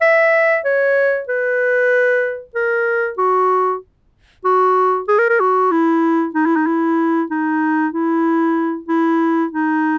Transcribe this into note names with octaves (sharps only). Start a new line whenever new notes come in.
E5
C#5
B4
A#4
F#4
F#4
G#4
A#4
A#4
F#4
E4
D#4
E4
D#4
E4
D#4
E4
E4
D#4